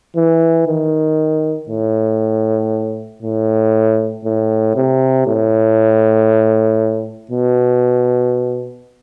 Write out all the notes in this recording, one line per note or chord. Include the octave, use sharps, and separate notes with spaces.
E3
D#3
A2
A2
A2
C3
A2
B2